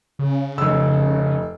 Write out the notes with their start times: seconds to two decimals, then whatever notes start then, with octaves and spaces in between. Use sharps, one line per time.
0.19 C#3
0.58 F1 E6